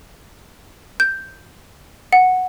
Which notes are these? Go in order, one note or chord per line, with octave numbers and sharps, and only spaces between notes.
G6
F#5